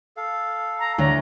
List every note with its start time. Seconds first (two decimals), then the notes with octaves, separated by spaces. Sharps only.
0.17 A4 F5
0.80 A#5
0.98 D2 A#5